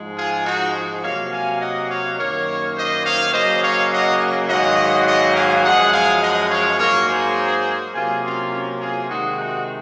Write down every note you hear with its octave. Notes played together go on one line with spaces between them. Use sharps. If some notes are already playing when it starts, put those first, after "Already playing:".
Already playing: G#2 F3 G#3
F4 G#4
D#4 F#4
C3 F#3 A#3 C#5 F5
F5 G#5
D#5 F#5
C#5 F5
F#2 D#3 A#3 A#4 C#5
C5 D#5
C#5 F5
C#3 F#3 A#3 C5 D#5
C#5 F5
D#5 F#5
G#2 D#3 F#3 A#3 D#5 F#5
D#5 F#5
F5 G#5
F#2 F3 G#3 D#5 F#5
F5 G#5
D#5 F#5
C#5 F5
G#2 F#3 A#3 A#4 C#5
G#4 C5
C3 F#3 A#3 F4 G#4
C#4 F4
C#4 F4
F4 G#4
C3 D#3 G#3 D#4 F#4
D#4 F#4